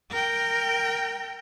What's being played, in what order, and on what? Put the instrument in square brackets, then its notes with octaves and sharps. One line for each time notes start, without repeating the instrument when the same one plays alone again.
[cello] A#4 G5